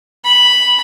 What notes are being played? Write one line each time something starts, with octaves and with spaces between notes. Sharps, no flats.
B5